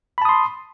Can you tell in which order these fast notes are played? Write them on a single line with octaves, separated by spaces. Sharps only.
B5 A5 D#6 C6